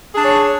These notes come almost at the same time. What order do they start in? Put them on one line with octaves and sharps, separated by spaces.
G#4 D4 C#5